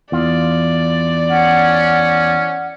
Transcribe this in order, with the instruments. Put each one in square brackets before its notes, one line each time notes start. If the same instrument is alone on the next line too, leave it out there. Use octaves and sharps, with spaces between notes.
[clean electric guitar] E2 F4 [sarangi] D5
[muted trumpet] C#4 [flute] F#5